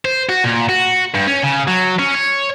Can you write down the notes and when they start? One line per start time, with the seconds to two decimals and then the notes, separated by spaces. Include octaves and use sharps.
0.05 C5
0.29 F#4
0.44 A#2
0.69 F#4
1.14 G2
1.27 C#4
1.43 C#3
1.68 F#3
1.99 C#4
2.14 C#5